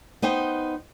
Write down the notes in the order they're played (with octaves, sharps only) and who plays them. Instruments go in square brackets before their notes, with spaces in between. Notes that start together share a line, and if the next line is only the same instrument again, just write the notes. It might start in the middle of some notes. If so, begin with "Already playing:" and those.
[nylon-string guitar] B3 D#4 C5 G5